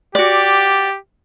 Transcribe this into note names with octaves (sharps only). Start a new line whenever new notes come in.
F#4 G4 D5